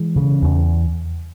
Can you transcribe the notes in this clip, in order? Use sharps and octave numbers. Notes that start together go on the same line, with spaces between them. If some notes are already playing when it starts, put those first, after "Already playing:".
Already playing: E3 G#3
C#3
E2